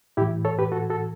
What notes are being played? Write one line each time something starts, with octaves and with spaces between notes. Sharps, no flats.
A2 E3 E4 G4
A4 C#5
G4 B4
F#4 A4
F#4 A4